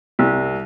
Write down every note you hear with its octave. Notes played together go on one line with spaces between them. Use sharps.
C2